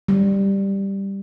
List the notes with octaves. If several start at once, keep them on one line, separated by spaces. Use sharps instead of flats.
G3